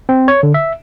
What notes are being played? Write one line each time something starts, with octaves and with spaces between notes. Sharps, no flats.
C4
C#5
D3
E5